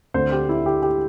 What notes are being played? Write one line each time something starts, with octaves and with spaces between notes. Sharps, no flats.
D2 D3 A3 C4 C5
G4
E4
G4
G4